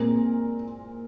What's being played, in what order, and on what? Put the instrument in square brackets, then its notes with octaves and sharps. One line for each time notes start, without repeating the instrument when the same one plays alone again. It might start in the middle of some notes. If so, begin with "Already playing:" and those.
Already playing: [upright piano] A#2 G#3 C4 A#4